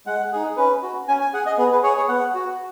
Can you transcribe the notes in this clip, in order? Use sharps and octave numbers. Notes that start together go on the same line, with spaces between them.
G#3 F#5
D#4 G#4
C#4 B4
F#4
C#4 G#5
G#5
G#4 F#5
D#5
B3 G#4
B4
G#4 C#5
C#5
B3 F#5
F#4